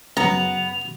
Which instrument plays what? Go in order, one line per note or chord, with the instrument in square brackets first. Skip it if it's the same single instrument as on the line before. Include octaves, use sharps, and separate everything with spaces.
[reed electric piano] F#2 C#3 [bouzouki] B3 [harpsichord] A#5 [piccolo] F7